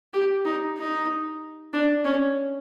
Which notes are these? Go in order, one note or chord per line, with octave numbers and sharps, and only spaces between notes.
G4
D#4
D#4
D4
C#4